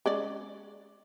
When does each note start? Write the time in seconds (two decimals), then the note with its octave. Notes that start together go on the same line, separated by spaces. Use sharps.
0.06 G#3 C#4 D5